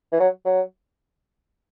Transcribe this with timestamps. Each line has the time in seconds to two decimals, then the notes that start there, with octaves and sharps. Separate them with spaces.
0.12 E3
0.20 F#3
0.45 F#3